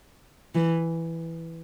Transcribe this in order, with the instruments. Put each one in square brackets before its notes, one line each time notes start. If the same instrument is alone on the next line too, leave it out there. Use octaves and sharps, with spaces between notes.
[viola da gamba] E3